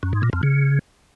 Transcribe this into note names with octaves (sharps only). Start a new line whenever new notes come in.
F#2
G#2
A#2
F2
C#3